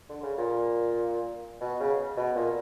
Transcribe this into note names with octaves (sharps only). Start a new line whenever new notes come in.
D3
C#3
A#2
B2
C#3
B2
A#2